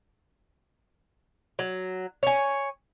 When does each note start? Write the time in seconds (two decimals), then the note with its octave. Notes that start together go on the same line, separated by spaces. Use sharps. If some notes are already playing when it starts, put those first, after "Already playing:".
1.59 F#3
2.23 C#5 G#5